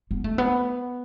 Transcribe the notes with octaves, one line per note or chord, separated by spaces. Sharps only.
B3
A3
B3